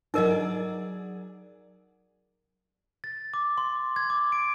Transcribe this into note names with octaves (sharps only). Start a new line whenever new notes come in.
F#3 D#4 G#4 A#4 D5 D#5
A6
D6
C6
G#6
D6
D7